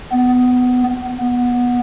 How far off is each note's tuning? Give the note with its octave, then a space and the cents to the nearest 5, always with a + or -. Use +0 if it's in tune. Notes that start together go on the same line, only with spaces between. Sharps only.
B3 +15
B3 -15